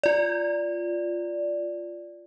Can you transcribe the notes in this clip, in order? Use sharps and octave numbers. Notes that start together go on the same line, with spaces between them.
F4 D5